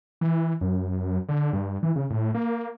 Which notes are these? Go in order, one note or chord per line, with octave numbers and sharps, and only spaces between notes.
E3
F#2
D3
G2
E3
C#3
A2
A#3